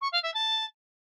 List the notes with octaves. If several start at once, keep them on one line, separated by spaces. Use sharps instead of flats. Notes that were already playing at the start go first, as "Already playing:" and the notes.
C#6
F5
E5
A5